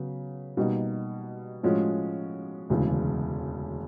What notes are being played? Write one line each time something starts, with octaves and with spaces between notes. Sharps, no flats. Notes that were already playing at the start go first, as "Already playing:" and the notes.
Already playing: C#3 F#3 B3
B2 G3 A#3 D#4
A2 F3 G#3 C#4 F#4
E1 D2 C#3 E3